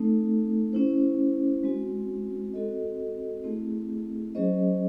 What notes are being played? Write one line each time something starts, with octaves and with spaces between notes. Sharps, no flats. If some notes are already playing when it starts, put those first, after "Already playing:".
Already playing: A3 C4 D#4 A4
C#4 E4 C5
G#3 C4 F#4
C4 F#4 A4 D#5
A3 C4 E4 G#4
F#3 C#4 G#4 C5 D#5